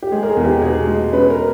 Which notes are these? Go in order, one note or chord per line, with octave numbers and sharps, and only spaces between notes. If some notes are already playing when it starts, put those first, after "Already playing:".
G4
G#3 G#4
A#4
G#4
E2
G4
B2 G#4
G#3
C#4 B4
A#4